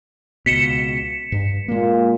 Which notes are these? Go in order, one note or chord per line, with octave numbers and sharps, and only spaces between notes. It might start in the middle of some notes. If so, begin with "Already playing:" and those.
C#2 B2 B6 C#7 E7
G2
A#2 G#3 A#3